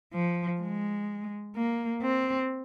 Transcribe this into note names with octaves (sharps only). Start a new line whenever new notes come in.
F3
G#3
A#3
C4